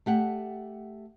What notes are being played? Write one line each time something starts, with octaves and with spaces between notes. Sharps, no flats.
A3 G4 F#5